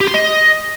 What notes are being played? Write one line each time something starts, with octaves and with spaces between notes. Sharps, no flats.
G4
C6
D#5